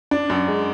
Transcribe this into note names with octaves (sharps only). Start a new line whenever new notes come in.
D4
F#2
G#3